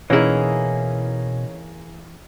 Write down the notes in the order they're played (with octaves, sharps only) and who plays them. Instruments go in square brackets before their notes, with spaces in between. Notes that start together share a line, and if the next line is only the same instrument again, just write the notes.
[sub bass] B2 [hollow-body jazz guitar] E3 E4 [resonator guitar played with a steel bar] A#3 G#4 [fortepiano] C#4 D#4